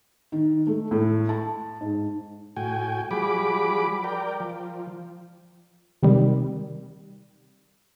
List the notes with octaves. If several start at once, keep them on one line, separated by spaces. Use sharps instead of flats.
D#3
A3
A2
A5
G#2
A2 F#4 G5 G#5
F3 G3 F#4 G#4 B5 D6
A#4 D5 G5
F3
C3 D#3 G3